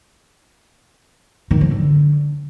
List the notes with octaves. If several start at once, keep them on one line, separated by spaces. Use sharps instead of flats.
D#3
F3
D3